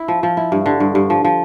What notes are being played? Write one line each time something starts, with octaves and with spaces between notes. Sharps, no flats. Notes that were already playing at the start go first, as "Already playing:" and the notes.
Already playing: E4
F3
F3
E4
G2
D3
G2
G2
F3
F3